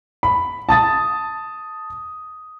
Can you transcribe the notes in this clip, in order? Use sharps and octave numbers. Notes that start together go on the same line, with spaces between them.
B5
A5 D#6 A6